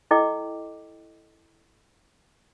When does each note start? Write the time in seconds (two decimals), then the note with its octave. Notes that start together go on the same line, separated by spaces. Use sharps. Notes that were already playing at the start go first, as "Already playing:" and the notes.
0.11 E4 A4 D#5 G5 D6